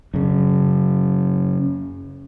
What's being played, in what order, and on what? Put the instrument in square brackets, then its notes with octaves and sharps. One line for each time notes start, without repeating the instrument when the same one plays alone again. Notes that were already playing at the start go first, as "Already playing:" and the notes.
[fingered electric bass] F#2 C#3